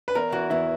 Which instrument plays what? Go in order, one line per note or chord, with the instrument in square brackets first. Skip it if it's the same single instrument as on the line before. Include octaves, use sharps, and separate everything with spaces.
[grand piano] B4
[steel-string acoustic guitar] E2 [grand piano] A#4
[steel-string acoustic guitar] E3 [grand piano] F#4
[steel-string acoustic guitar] E2 [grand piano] E4